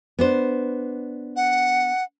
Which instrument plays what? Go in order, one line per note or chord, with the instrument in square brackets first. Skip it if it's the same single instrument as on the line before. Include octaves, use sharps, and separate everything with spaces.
[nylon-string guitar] B3 D4 C5
[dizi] F#5